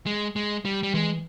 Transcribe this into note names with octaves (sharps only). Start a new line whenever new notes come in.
G#3
G#3
G3
G3
E3 G#3